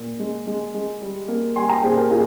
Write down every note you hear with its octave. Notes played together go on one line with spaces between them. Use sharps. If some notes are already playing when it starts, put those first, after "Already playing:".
Already playing: A#2
G#3
G#3
G#3
G3
A#3
G3 G#5 C6
G5 A#5
A#2 G#4 C5
G4 A#4
A#2 F4 G#4